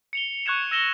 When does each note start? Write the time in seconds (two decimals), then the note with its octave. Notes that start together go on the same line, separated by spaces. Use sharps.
0.13 C#7 F7 G7
0.46 C#6 F#6 G#6 C#7 E7
0.71 E6 A#6 E7 G7